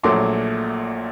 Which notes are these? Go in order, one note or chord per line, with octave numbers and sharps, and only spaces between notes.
A#1 A#2 F#3 A3 C6 D6